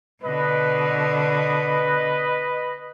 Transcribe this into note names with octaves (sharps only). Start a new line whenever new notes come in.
B2 D3 B4 D#5